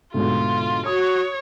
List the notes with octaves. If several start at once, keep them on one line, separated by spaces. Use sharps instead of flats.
D2 G#2 B2 F4
F#4 C#5 D#6